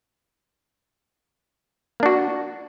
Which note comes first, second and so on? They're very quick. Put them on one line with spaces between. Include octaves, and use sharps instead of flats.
A#3 D4 F#4